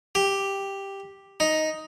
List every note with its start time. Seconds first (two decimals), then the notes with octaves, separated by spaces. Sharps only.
0.15 G4
1.40 D#4